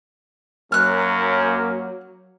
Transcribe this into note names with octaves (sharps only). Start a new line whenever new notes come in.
F#2 F#3 A#3 F6 F#6